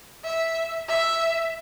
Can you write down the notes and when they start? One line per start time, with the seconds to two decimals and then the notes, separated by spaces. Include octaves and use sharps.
0.24 E5
0.88 E5